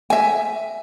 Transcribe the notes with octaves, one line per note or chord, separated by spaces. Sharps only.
E5 G#5